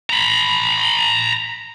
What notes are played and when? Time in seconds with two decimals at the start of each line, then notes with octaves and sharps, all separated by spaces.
0.10 A#5 B5